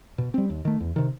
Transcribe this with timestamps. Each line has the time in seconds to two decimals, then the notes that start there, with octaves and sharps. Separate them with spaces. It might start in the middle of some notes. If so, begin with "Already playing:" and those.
0.18 B2
0.34 G3 C4
0.50 D#2
0.65 D#3 A3
0.80 E2
0.96 C3 D#3